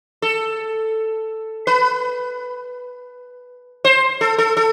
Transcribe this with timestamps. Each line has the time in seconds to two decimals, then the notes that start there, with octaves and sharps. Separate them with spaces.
0.22 A4
1.67 B4
3.85 C5
4.21 A4
4.38 A4
4.57 A4